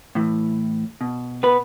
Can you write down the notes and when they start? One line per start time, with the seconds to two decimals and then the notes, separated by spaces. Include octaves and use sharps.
0.15 A2 E3
1.01 B2
1.43 B3 B4